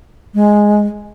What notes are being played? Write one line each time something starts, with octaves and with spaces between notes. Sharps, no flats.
G#3